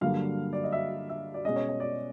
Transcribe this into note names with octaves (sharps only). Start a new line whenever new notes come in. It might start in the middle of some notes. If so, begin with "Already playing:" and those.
G2 D3 F#3 A#3 F5
D5
D#5
E5
E5
D5
B2 G#3 C#4 D#5
C#5
C#5
D5